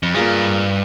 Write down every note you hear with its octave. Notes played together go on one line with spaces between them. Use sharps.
F2
G2 A#3 F4 G#4